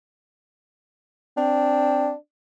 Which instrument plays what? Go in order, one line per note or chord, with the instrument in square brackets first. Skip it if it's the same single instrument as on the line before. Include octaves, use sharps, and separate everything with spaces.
[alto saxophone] C4 [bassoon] D4